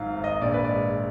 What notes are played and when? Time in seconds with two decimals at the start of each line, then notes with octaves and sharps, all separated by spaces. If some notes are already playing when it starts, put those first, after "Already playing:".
Already playing: G#1 G#2 F#3 F5
0.16 G#1
0.24 D#5
0.42 A#1 D5
0.54 B4
0.64 G#3 D5